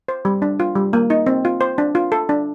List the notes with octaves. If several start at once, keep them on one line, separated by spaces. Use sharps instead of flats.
C5
G3
D4
F4
G3
A#3
D#4
C4
F4
C5
D4
F4
A4
D4